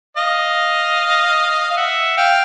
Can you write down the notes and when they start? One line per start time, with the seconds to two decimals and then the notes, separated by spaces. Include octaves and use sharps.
0.17 D#5 F5
1.71 F5
1.77 E5 F#5
2.17 F5 G5